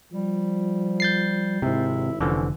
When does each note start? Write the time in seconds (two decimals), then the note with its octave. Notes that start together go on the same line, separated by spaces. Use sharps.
0.12 F3 G3
1.00 G6 A6 C7
1.62 G#1 G#2 C3 E4
2.21 F1 D3 E3 F3 C#4